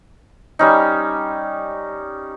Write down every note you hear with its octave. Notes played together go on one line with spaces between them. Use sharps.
G3 C#4 D#4